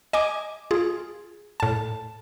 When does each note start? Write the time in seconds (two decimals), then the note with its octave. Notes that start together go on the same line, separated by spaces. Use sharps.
0.13 D#5 G#5 D6
0.71 F4 G#4
1.60 A2 A5